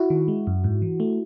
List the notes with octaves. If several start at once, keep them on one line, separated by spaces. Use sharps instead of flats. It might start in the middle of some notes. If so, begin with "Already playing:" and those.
Already playing: E4 F#4
D#3
G#3
F#2
G#2
E3
A3